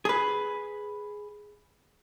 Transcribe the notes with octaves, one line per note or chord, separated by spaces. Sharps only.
G#4 B4